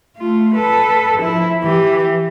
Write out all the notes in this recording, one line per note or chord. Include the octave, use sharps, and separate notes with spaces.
A3 F4
A4 B4
F3 E4
E3 G4